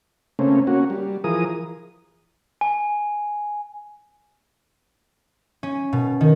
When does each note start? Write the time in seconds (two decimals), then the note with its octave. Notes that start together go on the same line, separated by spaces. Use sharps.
0.39 C#3 A3 A#3 C4 C#4
0.67 A#3 C#4 F#4
0.90 G3
1.24 E3 F3 G#4 A#4 D#6
2.61 G#5
5.63 C#4
5.93 B2
6.21 D#3